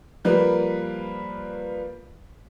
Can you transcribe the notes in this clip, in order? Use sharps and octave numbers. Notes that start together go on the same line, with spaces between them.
F3 G3 A#3 B4